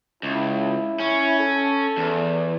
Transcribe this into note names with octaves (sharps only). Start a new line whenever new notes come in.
C#2 E4
C#4
A4
E2